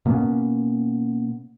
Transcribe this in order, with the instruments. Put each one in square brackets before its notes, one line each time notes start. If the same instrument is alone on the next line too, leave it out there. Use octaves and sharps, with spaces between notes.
[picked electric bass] B2 A#3 B3 C#4